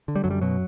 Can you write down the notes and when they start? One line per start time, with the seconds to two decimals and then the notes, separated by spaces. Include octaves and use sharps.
0.08 D3
0.16 G3
0.24 F#2 F#3
0.31 G3
0.41 B2 F#3